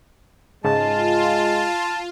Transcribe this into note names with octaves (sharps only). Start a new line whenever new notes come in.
G#2 C#3 G#3 F4 A5